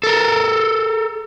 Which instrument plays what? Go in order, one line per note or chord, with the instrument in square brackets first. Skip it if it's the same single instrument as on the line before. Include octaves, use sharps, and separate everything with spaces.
[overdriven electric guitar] A4 A#4